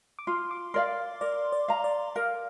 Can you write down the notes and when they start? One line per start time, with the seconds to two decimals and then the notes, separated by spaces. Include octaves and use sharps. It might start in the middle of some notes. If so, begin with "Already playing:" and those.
0.19 D6
0.27 F4 C6
0.51 D6
0.74 A#4 D5 F5 C6
1.21 A#4 D5
1.52 D5
1.68 F5 A#5
1.84 D5
2.16 A#4 F5